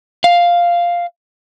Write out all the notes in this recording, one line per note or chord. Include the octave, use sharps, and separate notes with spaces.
F5